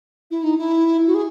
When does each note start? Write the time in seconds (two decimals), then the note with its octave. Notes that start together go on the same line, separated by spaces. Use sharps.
0.31 E4
0.44 D#4
0.58 E4
1.07 F#4
1.14 G#4